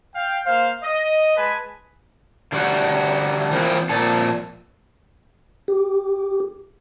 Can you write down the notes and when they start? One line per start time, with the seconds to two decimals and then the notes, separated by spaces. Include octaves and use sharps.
0.15 F5 G5
0.45 A#3 C5 F5
0.82 D#5
1.37 G#3 B4 G#5 A5 B5
2.52 D3 G3 F#4
3.51 E3 F3 A#3 C4
3.89 A#2 F3 A4
5.68 G4